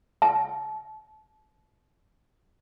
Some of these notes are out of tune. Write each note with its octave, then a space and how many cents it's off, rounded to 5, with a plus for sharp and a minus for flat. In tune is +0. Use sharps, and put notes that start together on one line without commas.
A5 -30